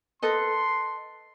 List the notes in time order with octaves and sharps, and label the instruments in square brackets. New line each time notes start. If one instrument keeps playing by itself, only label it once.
[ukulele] A4 B4 D#5 [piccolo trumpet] C6